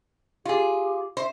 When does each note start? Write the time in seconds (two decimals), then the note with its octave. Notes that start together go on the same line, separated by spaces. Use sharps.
0.45 F4 G4 G#4
1.17 C5 E5